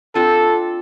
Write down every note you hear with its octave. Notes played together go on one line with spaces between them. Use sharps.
C4 D4 F4 A4